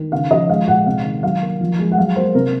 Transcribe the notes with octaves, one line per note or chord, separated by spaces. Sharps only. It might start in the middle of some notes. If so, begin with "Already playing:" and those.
Already playing: D#3
C#3 F5
F3 D#5
G#3 F5
A#2 F#5
C3 F5
D#3
F#3 F5
A#3
F3
G#3
F#5
F#3 F5
A#3 C5
C3 A#4